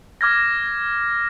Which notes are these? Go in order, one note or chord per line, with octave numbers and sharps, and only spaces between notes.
D6 F6 G#6 A#6